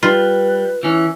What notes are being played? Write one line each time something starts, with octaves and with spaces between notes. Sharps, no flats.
G3 F4 B4
E3 C#4